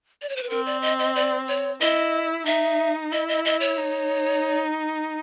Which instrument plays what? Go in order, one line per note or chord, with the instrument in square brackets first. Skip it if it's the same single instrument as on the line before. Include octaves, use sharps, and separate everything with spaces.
[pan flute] D5
C#5
C5
B4
[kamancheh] C4 [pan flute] A#4
[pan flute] D5
D#5
D#5
D5
C#5
[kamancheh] E4 [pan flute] D#5
[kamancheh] D#4 [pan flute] E5
[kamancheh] E4 [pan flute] D#5
[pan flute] D#5
D#5
C#5
[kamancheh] D#4